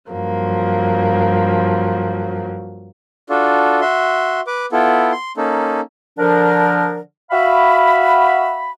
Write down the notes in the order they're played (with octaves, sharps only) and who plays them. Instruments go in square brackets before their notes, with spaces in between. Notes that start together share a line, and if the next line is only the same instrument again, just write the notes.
[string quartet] G2 F3 F#3 A#3
[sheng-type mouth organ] D4 F4 F#4 A4
F#4 E5 C6
B4 D6
B3 E4 F4 A4
C6
A#3 C#4 D#4 A4
[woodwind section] D3 F3 D4 A#4
F#4 E5 F5 B5